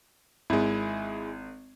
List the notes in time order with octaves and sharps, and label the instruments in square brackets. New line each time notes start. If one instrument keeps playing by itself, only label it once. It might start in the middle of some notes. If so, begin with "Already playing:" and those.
[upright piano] G#1 [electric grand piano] G#3 E4